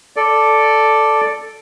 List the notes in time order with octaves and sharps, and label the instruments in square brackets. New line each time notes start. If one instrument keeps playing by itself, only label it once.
[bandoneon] A4 D5